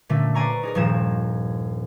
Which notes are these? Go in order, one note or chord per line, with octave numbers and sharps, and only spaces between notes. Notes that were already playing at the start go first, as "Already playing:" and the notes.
A#2 D3 A3 C#4
B4 C5 D5 G#5 A#5 C#6
D#4 G#4 A#4
D#1 G2 A#2 F3 G#6 E7